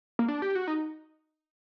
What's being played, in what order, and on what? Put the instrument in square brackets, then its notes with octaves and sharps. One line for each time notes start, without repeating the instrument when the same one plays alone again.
[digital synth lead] A#3
D4
G4
F#4
D#4